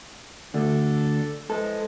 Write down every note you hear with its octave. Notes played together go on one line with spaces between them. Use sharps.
D2 D4 A4
E3 F3 G#3 A4